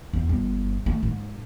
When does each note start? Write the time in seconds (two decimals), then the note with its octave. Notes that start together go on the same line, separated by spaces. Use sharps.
0.13 E2
0.29 G1
0.86 A3
1.03 G#2